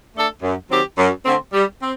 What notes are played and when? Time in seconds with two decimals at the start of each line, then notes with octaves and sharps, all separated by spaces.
0.14 A3 D4 A4
0.42 F#2
0.70 D#3 F#3 C4 G4
0.98 F#2
1.25 D3 A3 C4
1.53 G3
1.81 C4